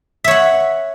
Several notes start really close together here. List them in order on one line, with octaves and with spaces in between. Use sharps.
E5 C#5 F#5